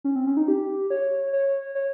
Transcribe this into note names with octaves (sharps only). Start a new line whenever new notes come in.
C#4
C4
C#4
D#4
G4
C#5
C#5
C#5